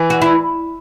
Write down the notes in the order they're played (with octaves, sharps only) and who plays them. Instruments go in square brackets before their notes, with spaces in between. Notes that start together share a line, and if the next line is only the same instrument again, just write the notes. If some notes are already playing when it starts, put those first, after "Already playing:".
Already playing: [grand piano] E3
[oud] F#4
E4